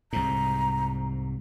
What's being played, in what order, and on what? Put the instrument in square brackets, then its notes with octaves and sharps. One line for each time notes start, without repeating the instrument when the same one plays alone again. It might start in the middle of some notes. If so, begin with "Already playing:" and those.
[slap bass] C2 G#2 [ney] A#5